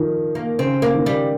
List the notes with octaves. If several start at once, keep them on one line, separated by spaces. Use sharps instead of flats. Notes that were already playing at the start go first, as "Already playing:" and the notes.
Already playing: D#3 F3
A#3
C#3 C4
A#3
D#3
G3